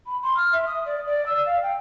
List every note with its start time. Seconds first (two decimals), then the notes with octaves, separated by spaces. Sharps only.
0.06 B5
0.22 C6
0.36 F6
0.52 E5
0.66 D#6
0.85 D5
1.06 D5
1.26 E6
1.45 F5
1.62 G5